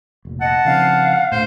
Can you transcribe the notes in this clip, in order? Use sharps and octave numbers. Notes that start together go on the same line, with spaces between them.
F1 A#1
D#5 F#5 A5
C#3 F3 C4 F5
D2 A2 C5